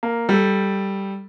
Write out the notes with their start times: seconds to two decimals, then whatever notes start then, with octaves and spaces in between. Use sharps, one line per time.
0.03 A#3
0.29 G3 A4